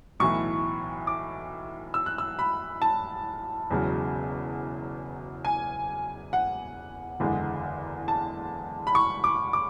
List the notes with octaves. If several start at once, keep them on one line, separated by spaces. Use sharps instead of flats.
B1 A2 E3 C#6
D6
E6
F#6
E6
B5
A5
E1 E2 C#3 F#3
G#5
F#5
F#1 E2 D3 G#3
A5
B5
C#6
D6
D6